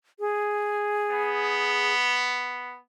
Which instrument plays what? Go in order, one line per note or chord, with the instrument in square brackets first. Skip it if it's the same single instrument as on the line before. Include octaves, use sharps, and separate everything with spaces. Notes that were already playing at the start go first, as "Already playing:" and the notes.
[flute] G#4
[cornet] B3